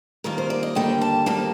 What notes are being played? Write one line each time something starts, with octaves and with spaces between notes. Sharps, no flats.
F2 D#3 G3 A#3 A#4
C5
D5
D#5
D#2 D3 G3 A#3 G5
A5
F2 D#3 G3 A#3 A5